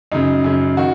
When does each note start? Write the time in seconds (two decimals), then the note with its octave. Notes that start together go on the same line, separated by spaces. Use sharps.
0.12 F#2 C#3 D#4
0.44 F#2 C#3
0.77 D#3 F#4